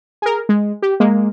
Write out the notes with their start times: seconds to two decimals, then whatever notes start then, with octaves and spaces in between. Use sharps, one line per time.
0.22 G#4 A#4
0.49 G#3
0.82 G4
1.00 G#3 A#3